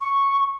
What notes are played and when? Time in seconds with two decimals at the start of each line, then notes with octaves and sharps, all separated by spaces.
0.01 C#6